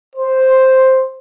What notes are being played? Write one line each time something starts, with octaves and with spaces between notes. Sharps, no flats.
C5